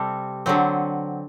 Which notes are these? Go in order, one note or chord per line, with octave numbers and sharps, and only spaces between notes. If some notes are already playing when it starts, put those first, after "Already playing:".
Already playing: C3 G3 C4 A4
D3 F#3 C4